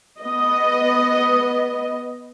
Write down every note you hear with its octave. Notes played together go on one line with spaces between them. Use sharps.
B3 D#5